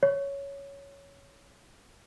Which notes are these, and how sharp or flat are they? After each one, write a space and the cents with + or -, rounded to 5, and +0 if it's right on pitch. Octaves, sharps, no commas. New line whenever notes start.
C#5 +5